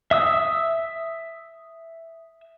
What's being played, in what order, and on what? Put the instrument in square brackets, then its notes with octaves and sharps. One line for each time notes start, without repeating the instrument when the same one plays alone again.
[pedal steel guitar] E5 D#6 E6